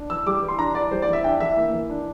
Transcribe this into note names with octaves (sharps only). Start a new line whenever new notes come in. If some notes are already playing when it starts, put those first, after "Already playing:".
Already playing: D4
E3 E6
G3 D6
E3
C6
D4 A#5
E3 D5
G3 C5
D5
E3
E5
D4 G5
E3 E5
A#3
E3
D4